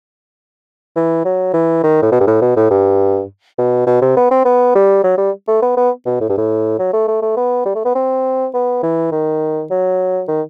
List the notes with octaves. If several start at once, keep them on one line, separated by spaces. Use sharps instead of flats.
E3
F#3
E3
D#3
A2
B2
G2
A2
B2
A2
G2
B2
B2
C3
B3
C4
B3
G3
F#3
G3
A3
B3
B3
B2
A2
G2
A2
F#3
A3
A3
A3
B3
G3
A3
B3
C4
B3
E3
D#3
F#3
D#3